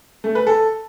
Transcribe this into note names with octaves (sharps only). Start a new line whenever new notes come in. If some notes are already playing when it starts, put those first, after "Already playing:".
A3
B4
A4